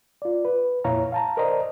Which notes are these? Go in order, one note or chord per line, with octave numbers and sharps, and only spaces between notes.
F4 D5
B4
F2 A#2 E4 C#5 F5 A#5
F5 A5 A#5
A#4 C5 D5 D#5 A#5